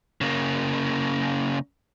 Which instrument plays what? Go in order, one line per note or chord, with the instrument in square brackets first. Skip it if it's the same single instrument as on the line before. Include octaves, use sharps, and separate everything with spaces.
[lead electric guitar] C#3 A#3